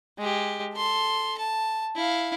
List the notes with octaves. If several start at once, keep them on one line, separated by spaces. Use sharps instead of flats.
G#3 G4
A4 C6
A5
E4 F5